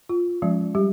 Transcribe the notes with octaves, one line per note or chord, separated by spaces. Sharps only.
F4
F3 G#3 C#4
G3 G4